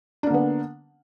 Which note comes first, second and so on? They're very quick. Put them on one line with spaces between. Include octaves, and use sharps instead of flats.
D4 A#3 D3 B3